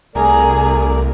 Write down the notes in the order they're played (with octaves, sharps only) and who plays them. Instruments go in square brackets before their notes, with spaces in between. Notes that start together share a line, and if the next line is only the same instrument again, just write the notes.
[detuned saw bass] C2 [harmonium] A3 A#4 D5 [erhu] G#4 [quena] A#5